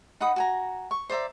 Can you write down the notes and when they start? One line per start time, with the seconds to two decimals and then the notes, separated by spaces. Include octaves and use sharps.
0.20 D#4 F#5 B5 D#6
0.36 F#4 G#5 A#5
0.91 C#6
1.09 C5 D5 E5 A#5